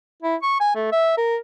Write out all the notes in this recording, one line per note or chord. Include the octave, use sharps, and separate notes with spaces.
E4
C#6
G#5
A3
E5
A#4